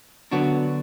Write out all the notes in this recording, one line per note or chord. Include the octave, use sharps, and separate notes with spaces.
D3 F#3 B3 D4 F#4